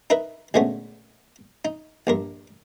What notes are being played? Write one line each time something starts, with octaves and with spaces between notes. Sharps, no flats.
D#4 A#4 B4 E5
D2 A#2 G#3 A3 B3 C#4
D#4
A#1 G2 A#4